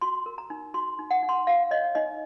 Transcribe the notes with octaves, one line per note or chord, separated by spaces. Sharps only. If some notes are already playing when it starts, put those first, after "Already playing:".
F#4 C6
A#4
A#5
D#4
F#4 C6
D#4
F#5
D#4
C6
A#4 F5
C#5 D#5
D#4 D#5